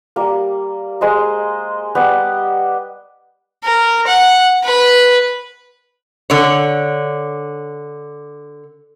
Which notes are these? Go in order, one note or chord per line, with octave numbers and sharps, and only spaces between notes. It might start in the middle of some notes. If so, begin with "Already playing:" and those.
G3 A#3
G#3 C5 D#5
G3 B3 G4 G5
A#4
F#5
B4
D3 C#5